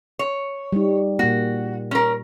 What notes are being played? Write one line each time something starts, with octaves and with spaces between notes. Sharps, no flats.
C#5
G3 D#4
A#2 A#3 F#4
C#4 A#4